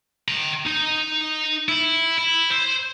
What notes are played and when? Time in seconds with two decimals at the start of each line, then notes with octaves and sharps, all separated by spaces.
0.28 G5 A#5
0.66 D#4
1.69 E4
2.18 E4
2.51 C5